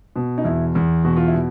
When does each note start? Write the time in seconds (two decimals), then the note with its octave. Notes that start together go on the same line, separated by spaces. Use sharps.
0.16 B2
0.38 D#4
0.44 E2 E4
0.75 E2
1.04 B2 F#4
1.17 F4
1.27 E4
1.34 B2